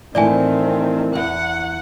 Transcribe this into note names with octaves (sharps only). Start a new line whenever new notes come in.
A2 D#3 E3 C4 D5 G#5 A5
E2 F#5